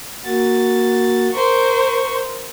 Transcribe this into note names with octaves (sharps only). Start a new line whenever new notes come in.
A#3 F#4 A6
A#4 C5 C#6